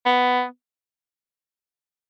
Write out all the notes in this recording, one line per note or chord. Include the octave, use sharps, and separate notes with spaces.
B3